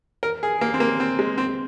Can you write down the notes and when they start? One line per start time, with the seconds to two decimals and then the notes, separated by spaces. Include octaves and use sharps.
0.23 A#4
0.43 G#4
0.61 A#3
0.74 C4
0.80 A#3
1.00 C4
1.19 G#3
1.38 C4